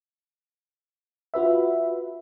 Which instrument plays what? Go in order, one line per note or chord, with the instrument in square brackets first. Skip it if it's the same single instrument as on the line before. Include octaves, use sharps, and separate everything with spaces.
[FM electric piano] F4 F#4 B4 E5